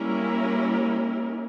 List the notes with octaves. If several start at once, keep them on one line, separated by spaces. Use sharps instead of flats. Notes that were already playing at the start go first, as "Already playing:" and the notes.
Already playing: G3 A#3 C#4 E4 A#4